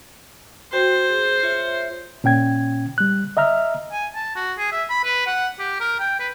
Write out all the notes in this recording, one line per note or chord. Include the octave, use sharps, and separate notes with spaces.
F#4 C5 G5
G#4
F4 C#5 E5
A#2 C#4 G5 G#6
G3 F#6
D#5 E5 A#5 F6
G#5
A5
F#4
G#4
E5
B5
B4
F#5
G4
A#4
G5
B4